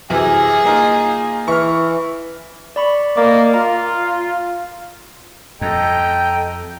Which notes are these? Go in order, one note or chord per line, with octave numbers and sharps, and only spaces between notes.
F#2 C3 E3 G#4
A#3 D#4 F4
E3 C#6 F6
D5 B5 C#6
A#3 D5 D#5 D6
F4 A#5
F2 A4 D#5 G5 A#5